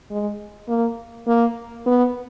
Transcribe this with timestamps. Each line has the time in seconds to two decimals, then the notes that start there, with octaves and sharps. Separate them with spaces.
0.11 G#3
0.68 A#3
1.27 A#3
1.86 B3